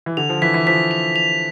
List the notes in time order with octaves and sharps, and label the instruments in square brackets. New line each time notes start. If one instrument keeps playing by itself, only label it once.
[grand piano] E3
[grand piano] D3 [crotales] F7
[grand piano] F3
[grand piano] E3 [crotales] B6
[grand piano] E3
[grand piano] F3 [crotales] B6
[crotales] F7
F7